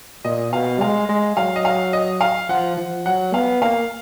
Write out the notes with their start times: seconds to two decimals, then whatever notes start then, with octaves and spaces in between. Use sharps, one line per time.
0.25 A#2 D#5
0.53 B2 F5
0.81 G#3 F5
1.09 G#3
1.37 F#3 F5
1.56 D#5
1.65 F5
1.93 D#5
2.21 F5
2.49 F3 F#5
2.77 F3
3.05 F#3 F#5
3.33 B3 F5
3.62 A#3 F5